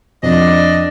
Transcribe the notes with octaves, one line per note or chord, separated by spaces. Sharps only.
F2 D4 D5 D#5